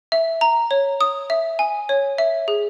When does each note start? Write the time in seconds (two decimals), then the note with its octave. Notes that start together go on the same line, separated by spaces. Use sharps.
0.12 E5
0.41 A#5
0.71 C#5
1.01 D#6
1.30 E5
1.59 G#5
1.89 C#5
2.18 E5
2.48 G#4